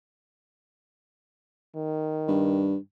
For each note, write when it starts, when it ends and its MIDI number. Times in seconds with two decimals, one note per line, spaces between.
1.76 2.79 51
2.28 2.77 43